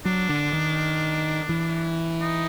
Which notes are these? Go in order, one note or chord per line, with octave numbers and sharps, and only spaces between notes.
F#3 D4
D3
D#3
E3
D#4